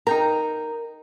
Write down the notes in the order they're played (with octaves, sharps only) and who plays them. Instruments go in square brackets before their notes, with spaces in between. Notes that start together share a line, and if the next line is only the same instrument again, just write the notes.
[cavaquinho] D#4 G5 A#5 [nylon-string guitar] A#4